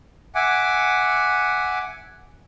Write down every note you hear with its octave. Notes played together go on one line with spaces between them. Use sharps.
E5 F#5 G#5 D6